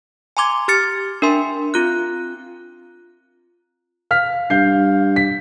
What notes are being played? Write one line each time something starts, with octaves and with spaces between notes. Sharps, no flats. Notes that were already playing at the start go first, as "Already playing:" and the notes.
G#5 A#5 C6 D6 G#6
G4 F6 A6 C#7
D4 A#4 E5 G#5 C6
C4 F4 F#6
F5 F6 B6
G2 F5 G6 C7
B6